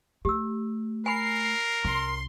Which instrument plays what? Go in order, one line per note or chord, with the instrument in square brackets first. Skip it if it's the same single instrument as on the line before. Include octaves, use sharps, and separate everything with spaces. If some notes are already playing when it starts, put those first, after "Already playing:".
[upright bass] A3 [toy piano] G4 E6
[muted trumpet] A#4 [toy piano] G#5 B5 [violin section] C7
[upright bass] C2 [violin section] C6